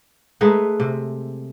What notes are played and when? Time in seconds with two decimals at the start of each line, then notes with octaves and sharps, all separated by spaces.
0.41 G#3 A3 D#4 B4
0.80 C3